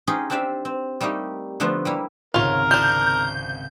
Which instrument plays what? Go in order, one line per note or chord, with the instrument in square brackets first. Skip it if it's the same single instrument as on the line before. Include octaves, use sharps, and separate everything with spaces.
[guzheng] C#4 D#4 F4 G4 G#4 D#5
C4 D4 G4 D5 E5 F5
C4
G3 A3 A#3 D#4 G4
D3 F3 A3 B3 F4
G3 A#3 E4
[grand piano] G#1 C#2 C3 [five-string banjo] F4 C#5 [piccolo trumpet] A#4
[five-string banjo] F3 D4 [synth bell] G6